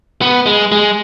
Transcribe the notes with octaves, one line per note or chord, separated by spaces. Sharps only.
B3
G#3
G#3